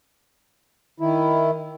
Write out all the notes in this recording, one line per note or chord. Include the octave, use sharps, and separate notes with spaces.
D#3 E4